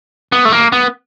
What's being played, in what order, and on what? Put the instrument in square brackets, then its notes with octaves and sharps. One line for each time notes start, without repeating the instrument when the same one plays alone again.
[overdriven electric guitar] B3
A3
A#3
B3